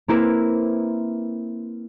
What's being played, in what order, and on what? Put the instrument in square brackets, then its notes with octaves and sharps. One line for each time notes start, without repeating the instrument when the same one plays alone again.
[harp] A#3 C4 E4 A#4 B4